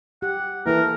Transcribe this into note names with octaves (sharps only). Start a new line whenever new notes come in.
G4 F#5
E3 A#3 E4 A4 A#4